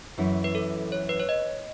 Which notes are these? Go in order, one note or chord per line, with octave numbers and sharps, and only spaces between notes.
F#2 E3 A3 E4
B4
A4
C#5
B4
C#5
D#5